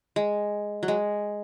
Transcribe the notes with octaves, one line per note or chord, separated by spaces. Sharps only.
G#3
F#3
G#3